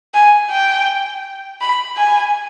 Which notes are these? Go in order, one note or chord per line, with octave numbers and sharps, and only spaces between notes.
G#5
G5
B5
G#5